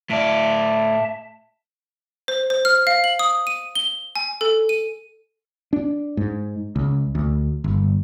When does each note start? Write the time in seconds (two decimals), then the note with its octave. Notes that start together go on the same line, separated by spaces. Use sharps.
0.10 A2 D5 E5 A5
2.28 C5
2.50 C5
2.65 F6
2.87 F5
3.04 F#7
3.19 D#6
3.47 D#7
3.75 G7
4.16 G#5
4.41 A4
4.69 D#7
5.73 D4
6.17 G#2
6.76 C#2
7.15 D2
7.64 G1